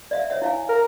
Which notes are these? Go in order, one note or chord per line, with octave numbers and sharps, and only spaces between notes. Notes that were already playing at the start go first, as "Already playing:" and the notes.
D5 E5 F5
C#5 E5 F#5
E4 F5 G#5
A#4